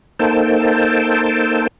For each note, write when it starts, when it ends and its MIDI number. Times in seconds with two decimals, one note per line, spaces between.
0.19 1.67 58
0.19 1.67 63
0.19 1.67 69
0.19 1.67 72
0.19 1.67 79
0.19 1.67 81